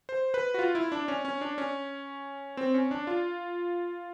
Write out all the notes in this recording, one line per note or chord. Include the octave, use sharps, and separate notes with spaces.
C5
B4
F#4
F4
E4
D4
C#4
C#4
D4
C#4
C4
C#4
D4
F4